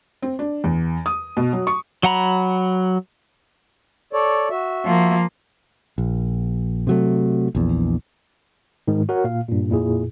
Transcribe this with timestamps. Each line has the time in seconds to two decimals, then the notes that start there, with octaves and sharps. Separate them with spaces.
0.22 C4
0.39 D4
0.64 E2
1.06 D#6
1.37 B2
1.53 F#3
1.67 C#6
2.03 F#3 F#5 A#5 B5
4.13 A4 C#5 D5
4.50 F#4 E5
4.85 F3 A#3
5.98 A#1
6.87 C3 F#3 A3
7.55 A#1 E2
8.88 G#2 D#3 G#3
9.09 F#4 A#4 C#5 F#5
9.24 A#2 F5
9.48 G2 A#2
9.70 F2 A#2 E4 G#4